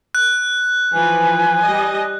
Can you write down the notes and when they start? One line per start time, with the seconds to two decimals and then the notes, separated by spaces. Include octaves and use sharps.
0.15 F#6
0.93 E3 F3 B4 G#5
1.63 G3 D#5